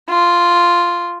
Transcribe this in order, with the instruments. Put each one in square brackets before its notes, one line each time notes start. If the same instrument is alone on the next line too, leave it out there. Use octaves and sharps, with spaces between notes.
[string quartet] F4